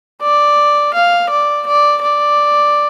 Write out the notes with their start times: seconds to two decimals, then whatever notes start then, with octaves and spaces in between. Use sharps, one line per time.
0.22 D5
0.94 F5
1.30 D5
1.67 D5
2.02 D5